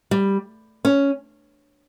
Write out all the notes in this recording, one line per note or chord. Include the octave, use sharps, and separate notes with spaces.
G3
C#4